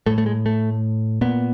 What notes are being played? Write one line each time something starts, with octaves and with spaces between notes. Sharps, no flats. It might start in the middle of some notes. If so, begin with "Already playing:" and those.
A2 A3
A3
G#3
A3
A#2 B3